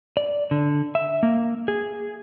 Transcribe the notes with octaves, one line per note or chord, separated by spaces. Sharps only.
D5
D3
E5
A#3
G#4